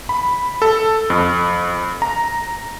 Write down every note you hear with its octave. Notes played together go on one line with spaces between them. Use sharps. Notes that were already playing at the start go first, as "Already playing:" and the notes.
B5
A4
F2
A#5